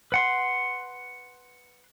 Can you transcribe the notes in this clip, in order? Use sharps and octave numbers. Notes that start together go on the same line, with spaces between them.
B4 F#5 C6